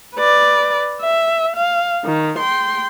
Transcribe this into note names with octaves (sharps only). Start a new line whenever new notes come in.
B4 D5
E5
F5
D#3
G5 C6